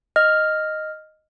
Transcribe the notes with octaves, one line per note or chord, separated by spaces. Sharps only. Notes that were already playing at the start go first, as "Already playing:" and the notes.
D#5 F6